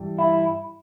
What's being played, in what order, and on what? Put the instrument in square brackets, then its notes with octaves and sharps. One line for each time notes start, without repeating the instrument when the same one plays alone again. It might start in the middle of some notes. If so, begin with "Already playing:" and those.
Already playing: [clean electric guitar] G2 E3 G3
E4